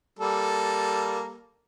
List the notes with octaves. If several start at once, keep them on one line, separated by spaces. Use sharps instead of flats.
G3 A#3 A4